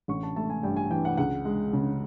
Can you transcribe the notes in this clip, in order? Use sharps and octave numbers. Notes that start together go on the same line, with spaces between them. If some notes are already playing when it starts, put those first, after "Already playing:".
A1 C#6
A5
A3 A5
G#5
G2 G5
G#5
E3 G5
F#5
C#2 F#5
G#3
C#3